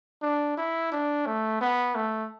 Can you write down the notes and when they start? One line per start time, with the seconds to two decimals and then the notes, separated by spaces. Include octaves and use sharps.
0.22 D4
0.58 E4
0.92 D4
1.26 A3
1.61 B3
1.95 A3